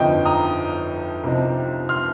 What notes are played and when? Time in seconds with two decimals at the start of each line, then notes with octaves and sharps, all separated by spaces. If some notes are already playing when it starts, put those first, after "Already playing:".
Already playing: G1 F2 F3 D#4 D#5 G5
0.25 A#5 D#6
1.23 C2 C3 F3 C4 D#4
1.89 C6 F6